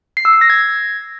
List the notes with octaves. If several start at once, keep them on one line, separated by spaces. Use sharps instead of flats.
C7
E6
C7
A#6
G#6